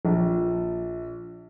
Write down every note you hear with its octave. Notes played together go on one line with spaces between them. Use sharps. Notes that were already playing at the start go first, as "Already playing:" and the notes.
A#1